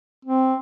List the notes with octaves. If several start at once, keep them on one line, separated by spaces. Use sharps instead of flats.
C4